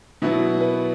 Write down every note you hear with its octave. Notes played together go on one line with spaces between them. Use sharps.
B2 F#3 B3 E4
B4